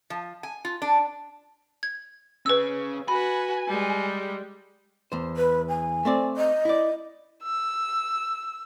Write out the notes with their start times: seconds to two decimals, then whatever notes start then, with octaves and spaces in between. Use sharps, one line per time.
0.10 F3
0.43 G#5
0.65 F4
0.82 D4
1.83 G#6
2.46 C#4 G#4 B4 E6
3.08 F#4 B4 G#5 B5
3.68 G3 G#3
5.12 E2 C5
5.36 B4
5.68 G#5
6.05 A3 C4 D5
6.36 D#5
6.65 E4 D5
7.43 E6